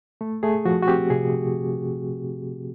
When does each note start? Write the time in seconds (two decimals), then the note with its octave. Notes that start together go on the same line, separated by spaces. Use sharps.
0.21 A3
0.43 A3 G#4
0.65 F3 F#4
0.82 F#4
0.87 C4 G4
1.10 C3 G#4